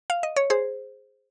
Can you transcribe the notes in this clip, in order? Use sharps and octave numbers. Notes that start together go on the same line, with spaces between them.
F5
D#5
C#5
G#4 C5